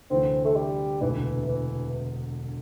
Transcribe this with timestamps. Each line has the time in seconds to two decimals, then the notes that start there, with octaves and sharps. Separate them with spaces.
0.10 D2 C3 E3 C4
0.45 A3
0.56 G3
1.02 E1 D2 C3 E3
1.48 E3